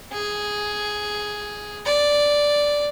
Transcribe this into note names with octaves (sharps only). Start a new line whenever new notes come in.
G#4
D5